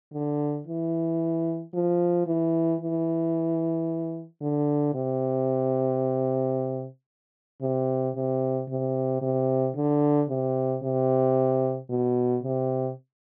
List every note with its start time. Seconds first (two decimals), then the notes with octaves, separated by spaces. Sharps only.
0.13 D3
0.67 E3
1.74 F3
2.27 E3
2.81 E3
4.41 D3
4.94 C3
7.62 C3
8.15 C3
8.69 C3
9.22 C3
9.76 D3
10.29 C3
10.83 C3
11.90 B2
12.43 C3